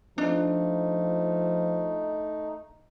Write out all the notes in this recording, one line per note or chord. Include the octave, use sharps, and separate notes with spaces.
F3 A3 D4 D#4